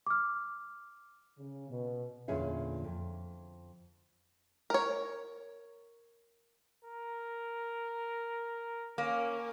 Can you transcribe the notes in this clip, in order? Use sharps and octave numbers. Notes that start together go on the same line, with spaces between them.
D6 F6
C#3
B2
E2 A#2 D3 C#4 G#4 E5
F2
A#4 C#5
A#4
A#3 C#4